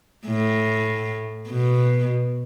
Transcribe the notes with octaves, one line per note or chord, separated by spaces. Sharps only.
A2
B2